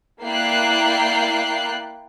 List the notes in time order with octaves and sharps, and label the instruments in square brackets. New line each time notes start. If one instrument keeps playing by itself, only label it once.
[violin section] A#3 E4 D5 G5 F#6 C7